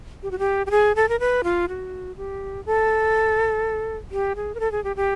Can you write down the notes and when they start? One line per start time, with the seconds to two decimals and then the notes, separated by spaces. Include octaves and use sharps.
0.23 G4
0.31 F#4
0.39 G4
0.66 G4
0.71 G#4
0.96 A4
1.09 A#4
1.20 B4
1.44 F4
1.69 F#4
2.17 G4
2.66 A4
4.11 G4
4.36 G#4
4.55 A#4
4.60 A4
4.72 G#4
4.84 G4
4.96 G4